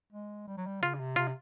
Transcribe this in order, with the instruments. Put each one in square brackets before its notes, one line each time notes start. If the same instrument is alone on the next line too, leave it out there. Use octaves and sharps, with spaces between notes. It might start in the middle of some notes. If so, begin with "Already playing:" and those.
[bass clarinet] G#3
G3
F#3
G3
[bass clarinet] C#3 [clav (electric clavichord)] F4
[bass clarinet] C3
[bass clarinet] C3 [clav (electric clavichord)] F4